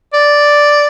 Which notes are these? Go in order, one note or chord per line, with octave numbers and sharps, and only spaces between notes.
D5